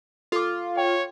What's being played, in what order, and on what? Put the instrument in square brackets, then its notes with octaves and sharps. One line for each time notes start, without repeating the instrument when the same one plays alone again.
[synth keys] F4 [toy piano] A4 D6
[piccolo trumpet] C#5 [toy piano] G5